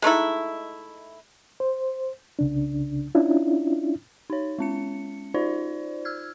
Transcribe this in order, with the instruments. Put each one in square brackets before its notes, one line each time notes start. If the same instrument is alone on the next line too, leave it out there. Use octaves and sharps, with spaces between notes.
[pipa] G#3 A3 D#4 E4
[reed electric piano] C5
C2 C#3 D4
C#4 D4 E4 F4
[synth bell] D#4 C#5
G#3 C#4 C#7
D#4 F4 C5 D5
E6 F6 G#6